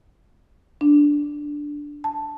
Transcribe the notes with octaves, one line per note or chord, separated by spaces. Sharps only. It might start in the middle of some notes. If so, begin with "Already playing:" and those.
D4
A5